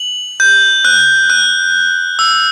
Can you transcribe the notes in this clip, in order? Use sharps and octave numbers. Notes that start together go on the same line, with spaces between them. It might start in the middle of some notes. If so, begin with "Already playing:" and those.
Already playing: F#7
G6
F#6
F#6
E6